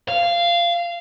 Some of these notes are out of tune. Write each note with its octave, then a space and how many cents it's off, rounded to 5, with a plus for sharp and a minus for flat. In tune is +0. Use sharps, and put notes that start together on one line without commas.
F5 -15